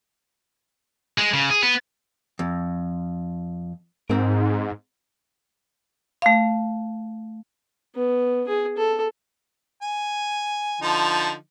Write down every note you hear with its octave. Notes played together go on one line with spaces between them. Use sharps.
G#3
C#3
G#4
B3
F2
G#2 C4 A#4
A3 F5
B3
G#4
A4
G#5
D3 F3 D#4